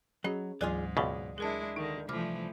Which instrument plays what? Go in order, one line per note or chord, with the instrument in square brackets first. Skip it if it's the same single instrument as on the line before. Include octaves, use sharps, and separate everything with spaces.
[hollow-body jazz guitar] F#3 D#5 [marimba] C#4 G#4
[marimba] D2 E3 F#3 [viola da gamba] G#2 [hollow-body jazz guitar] F4 G#4 D5
[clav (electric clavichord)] C#2 B2 [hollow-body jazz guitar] D5
[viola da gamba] G#3 D4 E4 [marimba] G#4 A#4 A5
[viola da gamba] D3 D#3 [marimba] D#4
[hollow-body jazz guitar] C2 [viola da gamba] E3 F3 A3 [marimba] B5 D6 F6